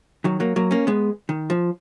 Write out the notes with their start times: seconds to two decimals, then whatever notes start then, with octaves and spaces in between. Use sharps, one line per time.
0.24 D#3 F#3
0.40 F#3 A#3
0.56 F#3 A#3
0.71 A#3 C#4
0.87 G#3 B3
1.29 D#3
1.50 F3